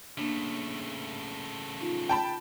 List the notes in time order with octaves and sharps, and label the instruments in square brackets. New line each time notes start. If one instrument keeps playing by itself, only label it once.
[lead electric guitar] C#3 A3 [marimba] A#3 D4
[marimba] D#4 F4
[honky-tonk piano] G5 A5 B5